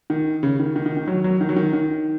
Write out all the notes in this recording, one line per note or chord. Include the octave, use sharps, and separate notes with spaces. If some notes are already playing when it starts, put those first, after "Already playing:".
D#3
C#3
D#3
D#3
D#3
D#3
F#3
F#3
D#3
F#3
D#3
D#3